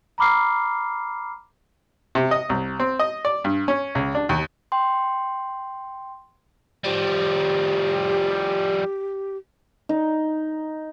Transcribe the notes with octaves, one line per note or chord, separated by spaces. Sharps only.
A#5 B5 D6 F6 C7
C3
D#5
C2
C4
D#5
D5
G2
C#4
C#2
D4
D#2
G5 C6
F3 G3 G4
D#4